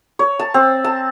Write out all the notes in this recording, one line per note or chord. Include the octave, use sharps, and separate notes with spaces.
C#5
A5
C4
A5